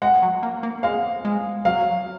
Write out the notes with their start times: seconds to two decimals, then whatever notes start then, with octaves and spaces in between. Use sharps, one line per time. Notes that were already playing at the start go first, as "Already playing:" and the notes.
0.02 G#3 F#5
0.22 F#3
0.43 A#3
0.63 A#3
0.83 G#3 F5
1.25 G#3
1.65 F#3 F5